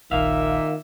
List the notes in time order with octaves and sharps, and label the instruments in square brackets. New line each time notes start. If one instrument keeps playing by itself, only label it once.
[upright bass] D#1 A#1 [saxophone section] A#2 D5 E5 [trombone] D#3 [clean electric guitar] F5